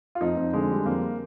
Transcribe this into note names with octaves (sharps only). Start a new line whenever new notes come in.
F4
F2 D#4
F2
D3 G#3
G3
F2 A#3